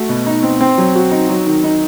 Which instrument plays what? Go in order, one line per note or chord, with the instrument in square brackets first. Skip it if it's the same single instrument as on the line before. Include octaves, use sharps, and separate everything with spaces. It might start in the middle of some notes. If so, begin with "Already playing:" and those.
Already playing: [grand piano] A3 F#4
B2
D#4
C4
C4
F#3
F#4
D#4
F#3
D#3
D#4